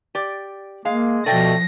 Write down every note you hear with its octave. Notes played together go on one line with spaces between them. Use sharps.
G4 D5
G#3 A#3 F5
B2 F3 A3 D5 D#5 G5 A#6